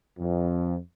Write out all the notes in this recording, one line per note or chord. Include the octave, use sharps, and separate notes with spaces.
F2